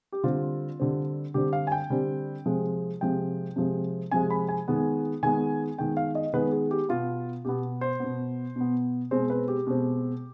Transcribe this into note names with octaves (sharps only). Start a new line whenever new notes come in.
G4
D3 G3 C4 F4
D3 G3 C4
D3 G3 C4 G4
F5
G#5
G5
D3 G3 C4
C3 F3 G#3
C3 F3 G#3 G5
C3 F3 G#3
C3 F3 G#3 G#5
B5
G#5
D#3 G#3 B3
D#3 G#3 B3 G#5
D#3 G#3 B3 G5
F5
D#5
D#3 G#3 B3 B4
G#4
G4
B2 B3 F4
B2 B3 G4
C5
B2 B3
B2 B3
B2 G#3 C4 C5
B4
G4
B2 G#3 C4